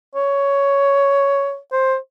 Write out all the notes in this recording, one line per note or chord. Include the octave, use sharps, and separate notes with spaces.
C#5
C5